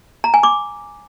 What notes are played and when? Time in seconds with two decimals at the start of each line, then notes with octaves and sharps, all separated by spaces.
0.24 A#5
0.34 G#5
0.43 D6